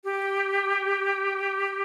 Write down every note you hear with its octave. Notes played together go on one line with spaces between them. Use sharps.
G4